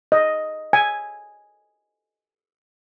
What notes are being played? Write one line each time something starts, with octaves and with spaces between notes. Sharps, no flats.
D#5
G#5